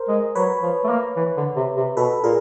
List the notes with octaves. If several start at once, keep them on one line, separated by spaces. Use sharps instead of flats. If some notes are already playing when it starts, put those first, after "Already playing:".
Already playing: A#4 C5
G#3
F#3 B4 C#5
F3
A3
A#3
E3
D3
C3
C3
B2 A4 B4
A#2 G#4 A#4